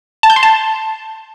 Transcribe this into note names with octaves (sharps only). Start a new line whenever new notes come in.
A5
G6
C6
A5